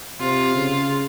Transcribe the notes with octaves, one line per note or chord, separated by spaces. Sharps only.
C3 F4
C#3